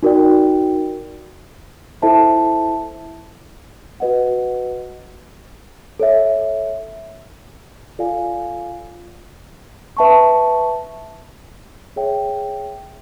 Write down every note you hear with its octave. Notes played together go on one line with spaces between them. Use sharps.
D#4 F#4 A#4 D5 G5
E4 A4 C5 E5 A5
F#4 B4 D#5 F#5
A4 C#5 E5
F4 A4 D5 F5 G#5
B4 E5 A5 C#6
G#4 C#5 E5 G5